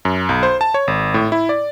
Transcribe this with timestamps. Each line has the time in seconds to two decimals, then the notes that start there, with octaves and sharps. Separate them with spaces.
0.05 F#2
0.29 B1
0.43 C5
0.61 A5
0.74 C#5
0.88 G#1
1.14 A2
1.32 E4
1.49 D5